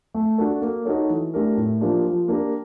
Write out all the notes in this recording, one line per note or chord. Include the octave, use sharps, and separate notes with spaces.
A3
D4 F#4 A4
A#3
D#4 F#4 A4 C#5
E3
A3 D4 G4 A#4
A2
F3 A#3 D4 G4
F3
A#3 D4 G4 A#4